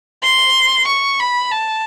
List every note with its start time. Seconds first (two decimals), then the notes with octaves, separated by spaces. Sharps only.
0.23 C6
0.87 C#6
1.20 B5
1.51 A5